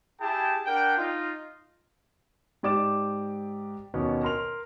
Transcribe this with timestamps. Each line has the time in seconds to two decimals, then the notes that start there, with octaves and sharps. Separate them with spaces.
0.21 E4 G4 G#4 G5 A5
0.66 D4 A#4 F#5 G5
0.98 D#4 F4
2.63 G#2 G4 D5 D6 A6 E7
3.94 D#2 B2 B3 C#4
4.23 A#4 C6 F7